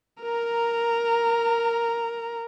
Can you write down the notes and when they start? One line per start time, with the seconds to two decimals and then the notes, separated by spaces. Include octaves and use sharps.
0.22 A#4 A#5